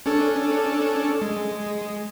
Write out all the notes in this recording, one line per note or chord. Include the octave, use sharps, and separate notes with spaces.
C#4 D4 A4
G#3